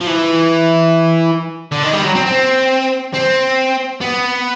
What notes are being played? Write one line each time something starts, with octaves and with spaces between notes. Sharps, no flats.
F3
E3
D3
D#3
G3
F#3
C4
C4
C4
B3